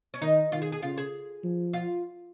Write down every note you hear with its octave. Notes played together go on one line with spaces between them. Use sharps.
C#4
D#3 D#4
D#3 F4
G#4
G#4
C#3 F4
G#4
F3
F4